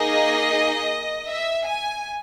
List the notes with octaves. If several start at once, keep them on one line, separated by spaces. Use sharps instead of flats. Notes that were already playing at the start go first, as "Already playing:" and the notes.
Already playing: A#3 D#4 G#4 D#5
E5
G#5